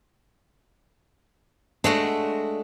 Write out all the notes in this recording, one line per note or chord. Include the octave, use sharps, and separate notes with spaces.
G#3 A3 D4 F#4